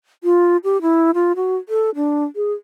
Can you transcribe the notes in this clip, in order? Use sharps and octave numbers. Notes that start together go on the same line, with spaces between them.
F4
G4
E4
F4
F#4
A4
D4
G#4